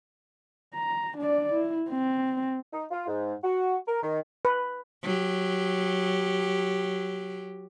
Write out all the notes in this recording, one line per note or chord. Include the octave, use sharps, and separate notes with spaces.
A#5
D4 D5
E4
C4
D#4
F4
G#2
F#4
A#4
D#3
B4
F#3 G4